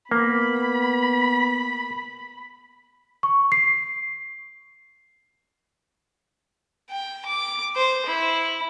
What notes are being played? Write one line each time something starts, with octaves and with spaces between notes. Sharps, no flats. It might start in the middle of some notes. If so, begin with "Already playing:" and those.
A#3 B3 B5
C#6
C7
G5
D6
C5
E4